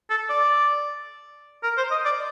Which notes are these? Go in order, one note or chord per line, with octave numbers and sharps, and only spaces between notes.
A4
D5
A#4
C5
D#5
D5